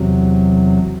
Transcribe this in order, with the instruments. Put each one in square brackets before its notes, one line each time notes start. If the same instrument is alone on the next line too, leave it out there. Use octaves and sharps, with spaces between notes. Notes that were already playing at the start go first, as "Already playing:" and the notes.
Already playing: [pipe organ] E2 C3 F#3